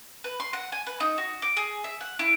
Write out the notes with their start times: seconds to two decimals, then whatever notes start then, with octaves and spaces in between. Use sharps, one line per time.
0.24 B4
0.40 C6
0.53 F#5
0.72 G#5
0.87 B4
1.00 D#4
1.18 F#4
1.42 D6
1.57 G#4
1.84 E5
2.01 F#5
2.19 E4